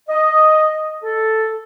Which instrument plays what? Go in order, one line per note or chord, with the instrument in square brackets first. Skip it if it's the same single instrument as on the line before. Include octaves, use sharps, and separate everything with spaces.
[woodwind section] D#5
A4